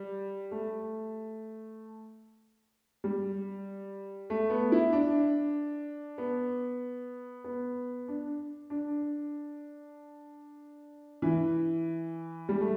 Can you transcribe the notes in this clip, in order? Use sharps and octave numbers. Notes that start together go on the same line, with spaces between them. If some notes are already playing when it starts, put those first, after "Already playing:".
Already playing: G3
A3
G3
A3
B3
E4
D4
B3
B3
D4
D4
E3
G3
A3